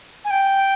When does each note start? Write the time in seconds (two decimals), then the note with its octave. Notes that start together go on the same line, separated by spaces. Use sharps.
0.25 G#5
0.30 G5